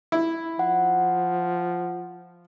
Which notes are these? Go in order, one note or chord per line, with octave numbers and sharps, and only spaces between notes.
E4
F3 F#5